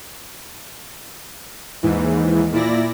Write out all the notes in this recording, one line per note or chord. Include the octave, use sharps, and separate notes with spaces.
D#2 G#2 E3
A#2 E4 D5 A#6